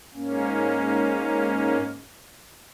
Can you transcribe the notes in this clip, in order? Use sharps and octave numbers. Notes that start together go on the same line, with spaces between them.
G#2 A#3 C#4